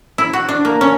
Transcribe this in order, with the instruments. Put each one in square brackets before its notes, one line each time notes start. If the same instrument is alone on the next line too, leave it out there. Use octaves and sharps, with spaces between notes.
[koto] E4
F#4
D4
A#3
C#4